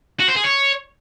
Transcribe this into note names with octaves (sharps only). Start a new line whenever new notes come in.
F#4
C5
G#4
C#5